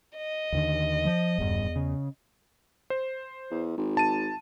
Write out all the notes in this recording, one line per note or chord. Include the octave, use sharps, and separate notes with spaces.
D#5
D#2 D3 D#3
F3
D#1 E2 G2
C#3
C5
E2
G#1
A5 D#7